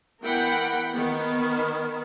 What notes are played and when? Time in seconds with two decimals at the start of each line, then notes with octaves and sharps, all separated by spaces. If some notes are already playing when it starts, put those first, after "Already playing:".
0.22 E3 B3 A#4 F#5 G5 B5
0.92 D#3 B3